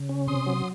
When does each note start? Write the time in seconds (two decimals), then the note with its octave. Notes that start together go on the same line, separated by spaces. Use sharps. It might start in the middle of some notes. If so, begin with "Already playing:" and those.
Already playing: C#3
0.09 C#4
0.27 C3 C6 D#6
0.46 F#3